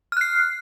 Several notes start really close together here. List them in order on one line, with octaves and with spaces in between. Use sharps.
F6 F#6 C7